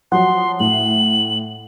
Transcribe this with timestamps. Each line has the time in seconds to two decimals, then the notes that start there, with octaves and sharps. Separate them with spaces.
0.12 F3 F#3 F#5 C6
0.60 A2 F#7